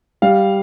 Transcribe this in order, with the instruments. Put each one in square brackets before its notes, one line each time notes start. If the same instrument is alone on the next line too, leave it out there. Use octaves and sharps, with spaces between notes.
[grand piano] G3 F5